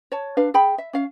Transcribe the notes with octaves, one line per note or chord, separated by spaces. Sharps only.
C#5 A5
D4 B4 F5
G#4 G5 B5
E5
C#4 F5